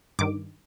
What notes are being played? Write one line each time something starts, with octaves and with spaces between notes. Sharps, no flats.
G2 D#3 D6